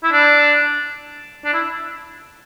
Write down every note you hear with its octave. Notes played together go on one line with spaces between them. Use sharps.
E4
D4
D4
E4